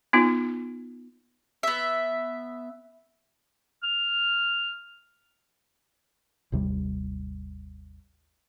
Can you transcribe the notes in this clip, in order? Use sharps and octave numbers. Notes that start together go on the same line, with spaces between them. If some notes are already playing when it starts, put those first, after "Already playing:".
B3 D#4 F4
B3 E5
F6
G#1 D#2 C3 G3